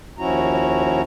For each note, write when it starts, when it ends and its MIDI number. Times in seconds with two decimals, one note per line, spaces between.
0.19 1.02 39
0.19 1.02 53
0.19 1.02 61
0.19 1.02 64
0.19 1.02 66
0.19 1.02 82